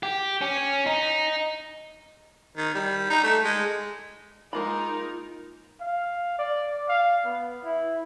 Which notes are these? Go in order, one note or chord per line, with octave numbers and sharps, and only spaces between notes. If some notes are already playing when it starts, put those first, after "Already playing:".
G4
C#4
D#4
D#3
G3
D#4
A3
G#3
G#3 A#3 D#4 F4 A#4 B5
F5
D5
F5
B3
E4